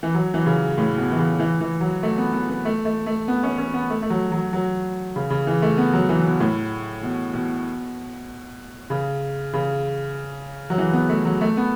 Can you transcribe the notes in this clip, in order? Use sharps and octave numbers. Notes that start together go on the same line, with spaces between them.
E3
F#3
E3
C#3
A2
B2
E3
C#3
E3
E3
F#3
A3
B3
B3
B3
A3
A3
A3
B3
C#4
C#4
B3
A3
A3
F#3
F#3
F#3
C#3
C#3
E3
A3
B3
F#3
E3
B2
A2
B2
B2
C#3
C#3
F#3
E3
B3
A3
F#3
A3
B3